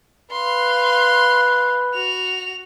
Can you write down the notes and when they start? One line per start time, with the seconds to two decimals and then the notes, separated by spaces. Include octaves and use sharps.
0.32 B4 F5 C6
1.94 F#4 F7